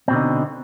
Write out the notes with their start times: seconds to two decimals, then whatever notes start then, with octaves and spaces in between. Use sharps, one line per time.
0.08 C4
0.10 B2
0.13 D3
0.16 D#4